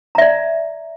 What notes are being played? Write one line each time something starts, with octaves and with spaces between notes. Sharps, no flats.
D5 E5 A#5